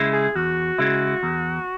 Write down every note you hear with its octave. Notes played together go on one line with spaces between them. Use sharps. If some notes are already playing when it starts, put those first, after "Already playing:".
Already playing: C#3 G#3 E4
G#4
E2 F#4
C#3 G#3 E4
E2